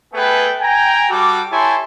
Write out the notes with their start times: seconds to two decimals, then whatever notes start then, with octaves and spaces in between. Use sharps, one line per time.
0.13 A3 B3 G#4 A4 B4 G5
0.61 G5 G#5 A#5
1.10 G3 F#4 A4 G5 D6
1.51 E4 G4 A4 C#5 G#5 C6